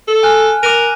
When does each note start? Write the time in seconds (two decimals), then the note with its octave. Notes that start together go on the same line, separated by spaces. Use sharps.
0.08 A4
0.23 G#5 F6 F#6
0.63 A#4 D6 F#6 D#7